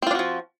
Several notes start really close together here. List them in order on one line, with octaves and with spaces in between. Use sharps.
C4 F4 D4 F#4 F3